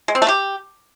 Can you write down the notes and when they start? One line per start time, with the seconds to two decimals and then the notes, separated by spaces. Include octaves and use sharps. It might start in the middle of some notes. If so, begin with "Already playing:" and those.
0.08 G#3
0.15 C4
0.22 A3
0.28 G4